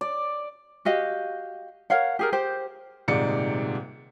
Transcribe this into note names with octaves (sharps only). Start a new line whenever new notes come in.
D5
F#4 G4 D#5 F5
A#4 C#5 F5 F#5
G4 G#4 A#4
G4 C5
D#1 G#2 C3 D#4 D5 C#7